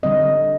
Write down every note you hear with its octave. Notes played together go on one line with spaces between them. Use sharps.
D3 G3 C4 D#5